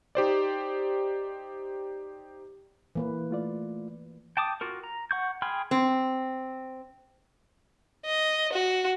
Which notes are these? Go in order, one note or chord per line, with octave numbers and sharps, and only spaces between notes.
D#4 G4 C5 D5
E3 A#3 B4
A3 F4 D5
G5 A5 D6 D#6
F4 F#4 A#4
A#5
F#5 C#6 G6
G#4 G5 B5 C6 F6
C4
D#5
F#4